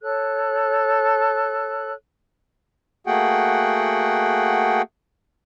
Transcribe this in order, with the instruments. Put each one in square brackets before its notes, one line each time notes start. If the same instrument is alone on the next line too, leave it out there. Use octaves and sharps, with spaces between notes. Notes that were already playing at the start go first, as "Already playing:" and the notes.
[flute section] A4 C#5 F#6
[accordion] A3 A#3 F#4 G#4 F#5 G5